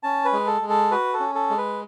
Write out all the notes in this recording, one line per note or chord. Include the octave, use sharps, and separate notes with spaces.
C#4 A5
B4
G#3
A4
G#3
A4
F#4 B4
A4
C#4
A4
G#3
B4